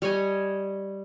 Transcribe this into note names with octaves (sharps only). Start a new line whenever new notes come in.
G3 C#5 D#5 G#5